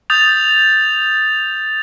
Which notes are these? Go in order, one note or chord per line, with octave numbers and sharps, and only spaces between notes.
D#6 G6 A6 F7